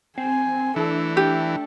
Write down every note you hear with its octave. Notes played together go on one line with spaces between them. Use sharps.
C4 G#5
E3 A3 D4 A4
G4